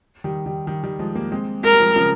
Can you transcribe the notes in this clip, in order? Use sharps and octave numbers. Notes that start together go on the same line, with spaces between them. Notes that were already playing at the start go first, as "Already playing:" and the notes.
D#3 G3
D#3 G3
D#3 G3
D#3 G3
F3 G#3
G3 A#3
G#3 C4
G#3 A#4
G3
F3 G#3
C#3 F3